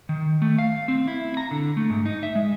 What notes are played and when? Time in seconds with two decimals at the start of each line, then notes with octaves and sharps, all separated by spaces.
0.09 D#3
0.42 A3
0.58 F5
0.88 C4
1.08 E4
1.37 A#5
1.51 D3
1.77 A3
1.90 G#2
2.06 D#4
2.23 E5
2.35 G#3